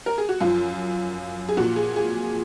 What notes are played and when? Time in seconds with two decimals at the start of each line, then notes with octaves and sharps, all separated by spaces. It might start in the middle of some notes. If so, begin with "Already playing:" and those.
0.06 A#4
0.18 G#4
0.29 F#4
0.41 F#2 F3 F4
1.49 G#4
1.57 A#2 F3 F#4
1.76 G#4
1.96 G#4